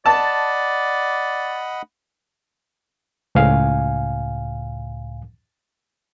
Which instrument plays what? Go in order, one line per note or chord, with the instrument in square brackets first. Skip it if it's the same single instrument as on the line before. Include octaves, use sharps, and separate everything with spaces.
[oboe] D5 [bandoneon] D#5 F#5 B5 [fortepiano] A5
[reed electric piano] C#2 A2 F5 G#5